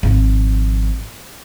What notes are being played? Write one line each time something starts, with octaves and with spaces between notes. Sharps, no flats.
G#1 F3